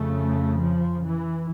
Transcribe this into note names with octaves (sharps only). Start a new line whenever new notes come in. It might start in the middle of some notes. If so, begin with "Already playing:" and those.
Already playing: F2 C#3 A3
F3
E3